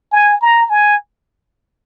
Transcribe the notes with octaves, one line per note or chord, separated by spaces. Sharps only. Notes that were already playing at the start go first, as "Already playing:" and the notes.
G#5
A#5
G#5